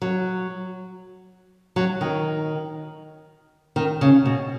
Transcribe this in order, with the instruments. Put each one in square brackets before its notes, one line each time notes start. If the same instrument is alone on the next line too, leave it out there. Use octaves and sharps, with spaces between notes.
[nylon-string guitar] F#3
F#3
D#3
D#3
C#3
B2